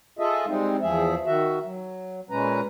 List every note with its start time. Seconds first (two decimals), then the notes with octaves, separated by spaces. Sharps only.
0.19 F4 G#4 A4 D#5 E5
0.47 G3 G#3 C4 D#4
0.82 E2 F3 G#4 E5
1.26 D#3 F#4 E5
1.64 F#3
2.30 A#2 G#3 C#4 B4 A#5